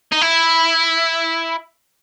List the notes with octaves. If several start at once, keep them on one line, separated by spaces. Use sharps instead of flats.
D#4
E4